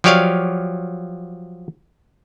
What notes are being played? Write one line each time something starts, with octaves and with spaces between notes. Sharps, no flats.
F3 F#3 G4 C#5 D5 F5